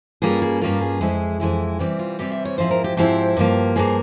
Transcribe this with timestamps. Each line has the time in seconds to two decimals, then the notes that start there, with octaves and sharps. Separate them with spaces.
0.22 G2 G3 A#3 C#4 F4 G#4
0.42 G#4
0.61 G2 G3 A#3 C#4 F4 A#4
0.81 G#4
1.01 F2 E3 G#3 E4
1.40 F2 E3 G#3 E4
1.79 C3 E3 G3 C4 G4
1.99 F4
2.19 C3 E3 G3 C4 G4
2.32 E5
2.45 C#5
2.58 G#2 F3 C4 E4 C5
2.71 A#4
2.84 G4
2.97 G#2 F3 C4 E4 G4
3.36 G2 F3 A#3
3.76 G2 F3 A#3 G#4